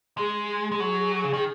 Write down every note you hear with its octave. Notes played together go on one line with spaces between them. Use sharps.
G#3 G#4
G#4
G#3
F#3
C#3
D#3